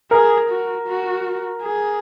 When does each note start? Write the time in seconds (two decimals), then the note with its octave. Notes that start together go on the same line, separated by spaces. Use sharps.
0.11 G#4 A#4
0.49 F#4
0.87 F#4
1.63 G#4